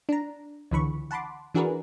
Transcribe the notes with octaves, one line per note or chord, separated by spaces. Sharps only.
D4 A#5
C#2 D3 E3 B5 C#6
F#5 A5 B5 C6 D6
E3 D4 F#4 G#4 A#4 B4